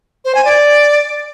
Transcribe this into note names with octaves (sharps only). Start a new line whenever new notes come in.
C5
G#5
D5